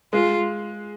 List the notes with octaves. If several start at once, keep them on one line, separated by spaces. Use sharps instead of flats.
G#3 F4